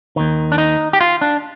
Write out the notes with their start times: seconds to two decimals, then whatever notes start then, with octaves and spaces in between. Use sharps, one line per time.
0.16 D#2 D#3
0.52 D4
0.58 D#4
0.93 G4
1.01 F4
1.21 D4